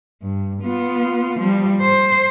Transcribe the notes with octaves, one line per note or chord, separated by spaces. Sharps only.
G2
B3 F4
F3 G3
C5